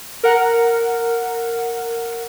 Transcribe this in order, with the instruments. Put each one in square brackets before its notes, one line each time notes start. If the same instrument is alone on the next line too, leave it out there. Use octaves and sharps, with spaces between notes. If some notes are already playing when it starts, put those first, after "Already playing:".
[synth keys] A#4 F#5